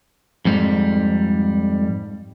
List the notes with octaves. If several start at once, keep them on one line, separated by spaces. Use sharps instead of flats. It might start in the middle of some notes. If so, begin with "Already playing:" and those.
F2 G#2 G3